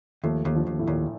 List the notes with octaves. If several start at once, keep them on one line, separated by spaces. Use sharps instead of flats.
D#2 F3 A3
D#2
D3 F3
D#2
A2
D#2 A#2